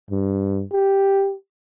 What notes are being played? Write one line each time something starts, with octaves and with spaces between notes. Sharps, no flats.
G2
G4